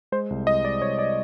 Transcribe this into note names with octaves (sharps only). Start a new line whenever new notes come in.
G#3 C5
C2
C2 D#5
G#3 D5
C2 C#5
D5